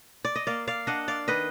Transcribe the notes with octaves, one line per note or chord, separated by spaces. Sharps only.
D5
D#5
A#3 D5 F5
D5 F5
D4 D#5 F#5
D5 F5
D#3 B4 D#5